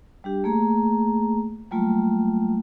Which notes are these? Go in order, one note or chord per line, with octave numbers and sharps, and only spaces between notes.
G3 D4 G4
A3 A#3 G#4 A#5
F#3 G3 A3 A#3 F4